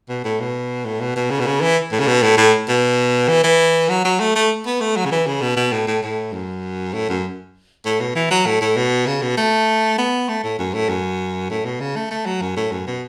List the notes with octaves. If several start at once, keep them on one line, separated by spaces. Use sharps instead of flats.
B2
A2
B2
A2
B2
B2
C#3
B2
C#3
E3
A2
C#3
B2
A2
A2
B2
E3
E3
F#3
F#3
A3
A3
B3
A3
F#3
C#3
E3
C#3
B2
B2
A2
A2
A2
F#2
A2
F#2
A2
B2
E3
F#3
A2
A2
B2
C#3
B2
A3
B3
A3
A2
F#2
A2
F#2
A2
B2
C#3
A3
A3
F#3
F#2
A2
F#2
B2